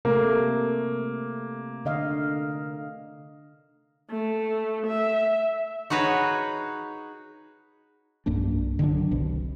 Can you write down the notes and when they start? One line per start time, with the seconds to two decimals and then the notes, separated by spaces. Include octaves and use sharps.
0.05 C3 A3 A#3
1.85 D3 D#5 F5
4.10 A3
4.87 E5
5.90 D#4 F#4 G#4 B4 C#5
8.26 B1 G2 A#3 D4
8.79 D3 D#3 F#3 D4
9.11 F#1 C2 B2